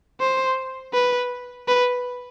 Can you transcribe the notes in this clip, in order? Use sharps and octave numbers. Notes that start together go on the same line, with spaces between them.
C5
B4
B4